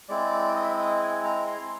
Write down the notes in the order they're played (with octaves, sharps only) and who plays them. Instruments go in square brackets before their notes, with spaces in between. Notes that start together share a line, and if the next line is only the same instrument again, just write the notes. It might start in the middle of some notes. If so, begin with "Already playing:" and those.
[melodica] G#3 C4 E4 D5
D#5
E5
D#5
G#5
A#5
C6